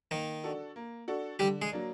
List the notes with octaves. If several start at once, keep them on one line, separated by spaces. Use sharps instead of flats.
D#3 A#3 D#4
D4 F#4 A4
A#3
D4 F#4 A4
D3 G3 G4
G#3 G#4
F#3 A#3 D4